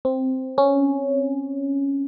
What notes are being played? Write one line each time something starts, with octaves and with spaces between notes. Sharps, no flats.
C4
C#4